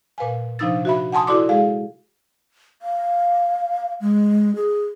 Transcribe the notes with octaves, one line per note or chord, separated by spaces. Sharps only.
A#2 B4 F5 G#5
C3 F3 D4 D#4 E6 A6
F#4 E5 B5
F#5 G#5 A5 C6 D#6
E4 F#4 A4 D5 C6 D6
G#3 G#4 F5
F5
G#3
G#4